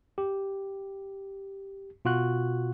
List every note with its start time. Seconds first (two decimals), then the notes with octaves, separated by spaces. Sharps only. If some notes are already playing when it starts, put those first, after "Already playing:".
0.18 G4
2.05 B2 F4 F#4 F#6